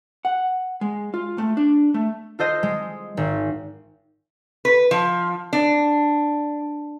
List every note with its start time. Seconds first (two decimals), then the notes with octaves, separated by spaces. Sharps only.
0.25 F#5
0.81 G#3
1.14 F4
1.38 A3
1.57 D4
1.94 A3
2.39 F4 A4 C5 D#5
2.63 G#3
3.17 G#1
4.65 B4
4.91 F3
5.53 D4